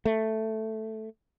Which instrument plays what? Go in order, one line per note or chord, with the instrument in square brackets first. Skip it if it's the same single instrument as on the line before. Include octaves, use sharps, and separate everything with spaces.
[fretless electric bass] A3